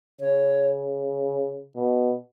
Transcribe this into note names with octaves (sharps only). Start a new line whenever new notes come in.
C#3 C#5
B2